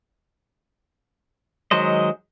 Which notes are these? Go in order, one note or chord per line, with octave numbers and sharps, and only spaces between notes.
D#3 F#3 G#3 C5 D#5